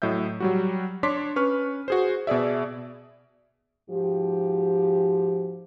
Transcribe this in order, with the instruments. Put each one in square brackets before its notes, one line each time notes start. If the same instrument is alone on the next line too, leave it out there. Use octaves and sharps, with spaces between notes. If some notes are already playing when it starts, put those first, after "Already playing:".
[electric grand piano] A2 F#3 D#5 E5 G6
F#3 G3 F#4
D4 C#5 C6 D6 B6
C#4 B4 C#6 F6
F#4 G#4 C5
B2 G#4 D5 E5
[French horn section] G#2 F3 F#4 G4